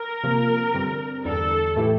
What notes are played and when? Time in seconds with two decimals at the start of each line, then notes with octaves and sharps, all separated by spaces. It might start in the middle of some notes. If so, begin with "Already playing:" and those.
Already playing: A#4
0.23 C3 F3 A#3
0.74 G2 D3 G3 C4
1.25 E2 D3 G3 A4
1.76 A2 E3 A3 E4 G4